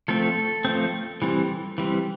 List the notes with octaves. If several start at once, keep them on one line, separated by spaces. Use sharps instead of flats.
F3 A3 C4 A4
F3 A3 C4
E3 G3 C4
E3 G3 C4